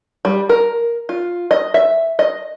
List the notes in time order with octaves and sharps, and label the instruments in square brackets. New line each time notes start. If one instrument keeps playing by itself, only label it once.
[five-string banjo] G3
A#4
F4
D#5
E5
D#5